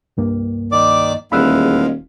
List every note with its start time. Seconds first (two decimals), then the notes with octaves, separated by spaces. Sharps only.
0.17 C2 G2 A#3
0.72 D#3 D5 D6
1.32 D#1 E2 G#3 F5 B5 E6 F#6